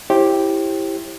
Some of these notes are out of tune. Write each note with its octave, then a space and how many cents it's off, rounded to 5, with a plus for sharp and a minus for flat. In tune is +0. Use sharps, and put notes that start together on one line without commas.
E4 +0 G4 +0 C5 +40